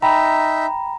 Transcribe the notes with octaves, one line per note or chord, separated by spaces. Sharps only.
D#4 E5 G5 A#5 B5